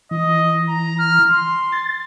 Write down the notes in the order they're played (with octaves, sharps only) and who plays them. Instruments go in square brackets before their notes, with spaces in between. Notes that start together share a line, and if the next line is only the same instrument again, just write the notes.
[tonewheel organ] E3 [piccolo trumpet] D#5
[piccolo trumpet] A#5
F6
C6
[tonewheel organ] A6